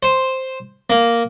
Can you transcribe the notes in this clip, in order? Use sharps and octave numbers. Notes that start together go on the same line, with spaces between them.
C5
A#3